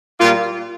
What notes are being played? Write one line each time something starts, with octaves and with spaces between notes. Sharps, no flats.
A#2 G3 A#3 F4